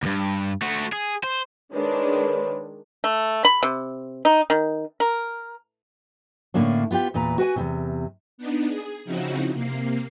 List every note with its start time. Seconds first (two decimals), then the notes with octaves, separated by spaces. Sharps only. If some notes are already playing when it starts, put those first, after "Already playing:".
0.03 D2 G2
0.62 A3 F#4
0.93 G#4
1.24 C5
1.72 D#3 G#3 D4 B4 C#5
3.04 A3
3.45 B5
3.63 C3
4.25 D#4
4.50 D#3
5.00 A#4
6.54 A2 D3 A#3 C#4 D4
6.91 B3 F4 G4 G5
7.14 E2 A#2 B4 A#5
7.38 F#4 B4 G5 G#5
7.56 E2 G#2 C3
8.38 B3 D4 D#4
8.68 G#4
9.05 C#3 F3 C4 D#4 E4 F#4
9.53 C3 A#3 C7